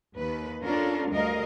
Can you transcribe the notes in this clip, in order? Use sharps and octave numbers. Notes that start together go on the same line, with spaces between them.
D#2 B4
C#4 D4 F4 A4 A#4
D2 G3 A3 A#4 D#5 F5